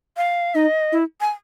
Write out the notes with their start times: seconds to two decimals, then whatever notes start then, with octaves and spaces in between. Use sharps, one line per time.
0.17 F5
0.55 D#4 D#5
0.92 E4
1.21 G#5